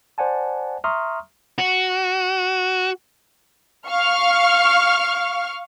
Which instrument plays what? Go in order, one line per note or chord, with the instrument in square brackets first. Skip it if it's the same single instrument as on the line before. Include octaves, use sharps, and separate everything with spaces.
[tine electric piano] C5 D5 F#5 G#5 A5
E5 A#5 C6 C#6 D#6 F6
[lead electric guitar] F#4
[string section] F5 C#6 F6